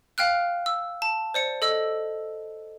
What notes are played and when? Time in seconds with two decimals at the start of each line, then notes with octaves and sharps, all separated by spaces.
0.18 F5 G5 F6 F#6
0.66 E6
1.02 A5
1.34 C5 D5 C#7
1.62 A4 D#5 E6